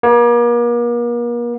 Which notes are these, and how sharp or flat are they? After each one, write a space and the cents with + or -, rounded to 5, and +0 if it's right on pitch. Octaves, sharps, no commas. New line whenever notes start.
A#3 +40